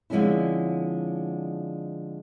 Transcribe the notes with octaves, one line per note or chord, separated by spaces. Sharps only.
D3 F3 G#3 C4 C#4 E4